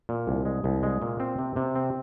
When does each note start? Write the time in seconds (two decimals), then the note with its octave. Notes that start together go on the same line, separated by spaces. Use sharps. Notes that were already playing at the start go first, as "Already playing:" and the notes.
0.09 A#2
0.27 C2
0.45 G#3
0.64 C2
0.83 G#3
1.02 A#2
1.20 C4
1.38 C3
1.56 C3
1.75 C4